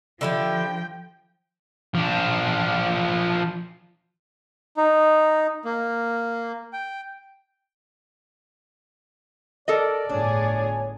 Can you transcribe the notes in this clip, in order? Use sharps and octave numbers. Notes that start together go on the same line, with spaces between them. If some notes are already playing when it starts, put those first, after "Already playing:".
D3 F3 E4 G4 G5
F3 D4
D#4
A#3
G5
A4 A#4 D5 D#5
G1 A2 D4 G#4 C#5